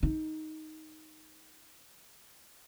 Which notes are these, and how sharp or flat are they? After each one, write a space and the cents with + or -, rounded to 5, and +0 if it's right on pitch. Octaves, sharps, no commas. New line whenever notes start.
D#4 +5